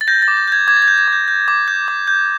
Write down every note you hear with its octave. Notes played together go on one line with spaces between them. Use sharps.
A6
G6 A#6
A6
D6
G6
G6 G#6
D6 G#6
A6
G#6
G6
G#6
D6 G6
G6
D6
G6
D6
G6